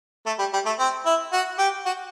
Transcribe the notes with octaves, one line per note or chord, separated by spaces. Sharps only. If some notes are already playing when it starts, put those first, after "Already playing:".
A3
G3
G3
A3
C4
E4
F#4
G4
F#4